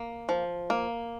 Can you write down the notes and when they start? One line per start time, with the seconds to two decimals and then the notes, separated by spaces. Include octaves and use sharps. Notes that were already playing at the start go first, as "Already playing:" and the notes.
Already playing: A#3
0.29 F3
0.70 A#3